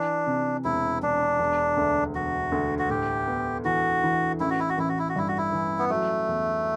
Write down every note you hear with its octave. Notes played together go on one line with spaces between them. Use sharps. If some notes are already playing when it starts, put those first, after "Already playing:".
Already playing: E3 D4
C3
E1 E4
E1 D4
E1
D2
E1 F#4
D2
F#4
A2 G4
B3
E3 F#4
E3
A1 E4
F#4
E4
F#4
A1 E4
F#4
E4
F#4
G2 E4
F#4
E4
E3
B3
F#3 A3
E2